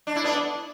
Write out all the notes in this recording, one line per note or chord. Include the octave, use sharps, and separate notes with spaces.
D4
E4
B3 D4